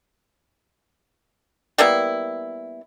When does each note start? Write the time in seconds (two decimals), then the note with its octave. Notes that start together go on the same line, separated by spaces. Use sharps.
1.78 G3 A#3 B3 E4